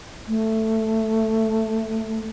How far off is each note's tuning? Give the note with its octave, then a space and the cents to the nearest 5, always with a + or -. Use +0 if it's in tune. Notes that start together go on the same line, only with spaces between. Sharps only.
A3 +5